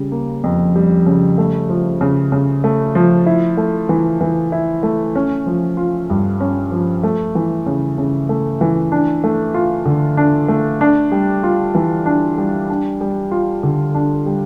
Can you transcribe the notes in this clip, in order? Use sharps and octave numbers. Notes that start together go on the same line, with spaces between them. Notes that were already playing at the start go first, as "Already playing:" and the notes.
Already playing: C#3 G3
A#3
F2
G3
C#3
A3
F3
C#3
C#3
A3
F3
E4
A3
E3
E3
E4
A3
C#4
F3
F4
G2
C#4
F3
A3
E3
C#3
C#3
A3
E3
D4
A3
F4
D3
D4
A3
D4
G3
F4
E3
D4
G3
D4
G3
F4
D3
D4
G3